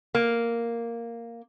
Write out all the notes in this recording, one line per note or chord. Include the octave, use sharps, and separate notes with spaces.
A#3